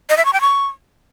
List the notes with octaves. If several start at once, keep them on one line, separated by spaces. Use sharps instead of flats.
D#5
E5
C#6
G5
C#6